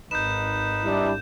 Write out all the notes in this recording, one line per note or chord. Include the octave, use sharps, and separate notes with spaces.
G#1 D#4 B4 G6 E7
G3 D4 E4